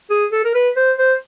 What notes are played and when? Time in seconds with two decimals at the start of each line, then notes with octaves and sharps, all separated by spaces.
0.10 G#4
0.32 A4
0.44 A#4
0.54 B4
0.76 C5
0.98 C5